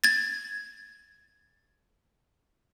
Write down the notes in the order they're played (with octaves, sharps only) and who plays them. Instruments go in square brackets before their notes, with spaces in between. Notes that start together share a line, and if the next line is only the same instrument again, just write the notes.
[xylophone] G#6 A6